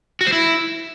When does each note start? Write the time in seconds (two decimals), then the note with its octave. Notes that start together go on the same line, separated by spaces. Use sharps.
0.21 F#4
0.27 C5
0.32 E4